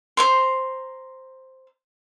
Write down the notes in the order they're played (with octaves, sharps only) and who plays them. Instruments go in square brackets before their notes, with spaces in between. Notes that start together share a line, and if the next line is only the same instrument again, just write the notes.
[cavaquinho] C5 A#5 C6